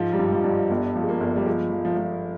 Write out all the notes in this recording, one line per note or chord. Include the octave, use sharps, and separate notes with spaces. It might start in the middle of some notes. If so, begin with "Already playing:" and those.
Already playing: G#2 F3
G3
G2
F3
G2
G1 G3
F3
G#3
A#3
G1
G3
F3 G#3
F3
F3
F3